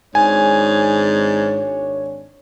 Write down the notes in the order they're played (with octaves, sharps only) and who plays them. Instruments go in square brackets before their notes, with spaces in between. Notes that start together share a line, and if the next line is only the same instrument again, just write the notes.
[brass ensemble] G#1 D4 C#5 [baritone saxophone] G#2 [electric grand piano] G#5